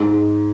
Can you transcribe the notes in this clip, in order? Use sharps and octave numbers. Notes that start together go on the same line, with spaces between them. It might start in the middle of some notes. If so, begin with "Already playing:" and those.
Already playing: G#2